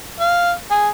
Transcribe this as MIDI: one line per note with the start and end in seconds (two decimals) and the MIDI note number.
0.20 0.51 77
0.71 0.88 68